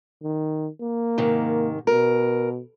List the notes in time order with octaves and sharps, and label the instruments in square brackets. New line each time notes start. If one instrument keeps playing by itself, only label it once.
[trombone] D#3
A#3
[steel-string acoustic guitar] G#2 C3 D#3
[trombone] B2 [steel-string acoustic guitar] A#4